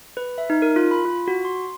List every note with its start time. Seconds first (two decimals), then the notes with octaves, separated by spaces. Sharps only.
0.17 B4
0.38 E5
0.50 D#4
0.62 A#4
0.76 F4
0.91 B5
1.05 F4
1.28 F#4
1.45 C6